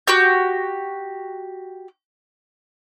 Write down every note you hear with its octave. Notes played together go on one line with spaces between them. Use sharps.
F#4 G4 G6